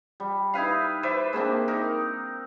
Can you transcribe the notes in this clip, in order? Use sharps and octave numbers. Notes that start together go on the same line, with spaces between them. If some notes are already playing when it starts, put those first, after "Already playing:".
G3
D#4 E4 B4 F5
B4 C5 D5 E5
G#3 A#3 C4 D4
D#4 A#4